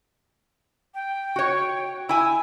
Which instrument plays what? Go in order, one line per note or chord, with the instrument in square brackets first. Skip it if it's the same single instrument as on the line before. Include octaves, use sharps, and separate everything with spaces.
[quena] G5
[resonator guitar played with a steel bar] F#4 C#5
[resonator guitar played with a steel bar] E4 G#5 [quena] E6